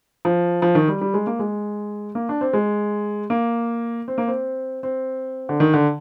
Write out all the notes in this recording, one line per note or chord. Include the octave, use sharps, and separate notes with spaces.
F3
F3
D#3
G3
G3
G#3
A#3
G#3
A#3
D4
C4
G#3
A#3
C4
A#3
C4
C4
D3
D#3
D3